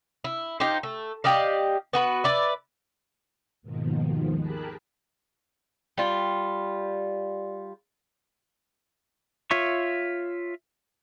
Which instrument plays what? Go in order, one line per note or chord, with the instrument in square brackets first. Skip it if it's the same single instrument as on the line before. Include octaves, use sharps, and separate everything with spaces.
[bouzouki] E4
D#4 F4 G4 C5
A3
G4 D5 D#5 F5
B3 F#4 B4
B4 D5 E5
[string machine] D#2 G#2 B2 D#3 F3
G4 G#4 A#4 A5 B5 F#6
[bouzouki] G3 F4
[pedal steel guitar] F4 C#5 E5 C#6